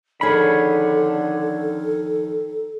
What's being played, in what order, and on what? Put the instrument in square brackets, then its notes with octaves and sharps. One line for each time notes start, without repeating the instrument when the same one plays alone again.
[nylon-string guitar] F2 D#3 G#4 [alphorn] D3 [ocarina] A4 [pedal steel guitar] C#5 B5